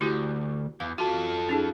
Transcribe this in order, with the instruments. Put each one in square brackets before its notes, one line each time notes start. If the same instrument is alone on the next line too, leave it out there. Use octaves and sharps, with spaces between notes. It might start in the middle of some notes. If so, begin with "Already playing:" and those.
[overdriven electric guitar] D2 [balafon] E4 F#4 G4
[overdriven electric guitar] E2 [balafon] F5
[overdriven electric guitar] F4 A4 [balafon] F#4
[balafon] C#4 D#4 G#4